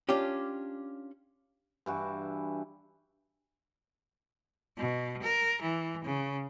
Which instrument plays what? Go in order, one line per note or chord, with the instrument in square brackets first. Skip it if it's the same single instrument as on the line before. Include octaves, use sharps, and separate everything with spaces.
[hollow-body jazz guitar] C#4 D4 F4 G4
[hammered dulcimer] G2 E3 F#4
[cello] B2
A#4
E3
C#3